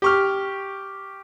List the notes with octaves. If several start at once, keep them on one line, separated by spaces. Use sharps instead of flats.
G4 C#6 F6